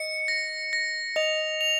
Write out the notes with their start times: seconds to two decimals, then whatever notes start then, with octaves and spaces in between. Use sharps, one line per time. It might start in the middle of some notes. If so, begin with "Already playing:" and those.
Already playing: D#5 C#7
0.28 A#6
0.73 A#6
1.16 D#5 F7
1.61 F7